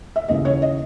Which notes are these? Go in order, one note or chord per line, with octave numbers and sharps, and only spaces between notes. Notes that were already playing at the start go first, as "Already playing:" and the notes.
E5
D#2 C#3 E3 D#5
C#5
D#5